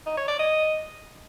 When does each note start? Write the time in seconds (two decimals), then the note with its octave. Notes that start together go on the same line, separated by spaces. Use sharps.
0.06 D#4
0.17 C#5
0.28 D5
0.39 D#5